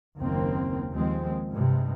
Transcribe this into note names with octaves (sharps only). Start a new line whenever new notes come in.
F#1 D#2 C#3 A#3 C4
D#2 F3 G#3 C4
G2 C3 G#3